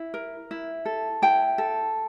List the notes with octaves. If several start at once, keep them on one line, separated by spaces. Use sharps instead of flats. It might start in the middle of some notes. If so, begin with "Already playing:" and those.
Already playing: E4
A#4
E4
A4
E4 G5
A4